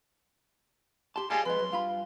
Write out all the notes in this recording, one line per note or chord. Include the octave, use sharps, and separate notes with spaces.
G4 A5 C6
G3 G#3 F4 G4 G#4 G#5 A5
F2 G#3 B4 C6
F#2
G2 F4 F5 B5